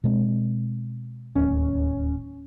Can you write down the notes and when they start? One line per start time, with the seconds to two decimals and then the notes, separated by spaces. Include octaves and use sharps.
0.04 B2 G#3 C4
1.35 D1 D#2 C#4